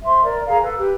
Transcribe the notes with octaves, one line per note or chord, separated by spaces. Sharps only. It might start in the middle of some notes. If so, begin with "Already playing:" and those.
C5 E5 C6
A#4 D5
G#4 F5 A#5
A4 B4
G4 B4